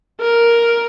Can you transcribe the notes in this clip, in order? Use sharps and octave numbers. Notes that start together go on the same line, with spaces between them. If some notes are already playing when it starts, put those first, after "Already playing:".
A#4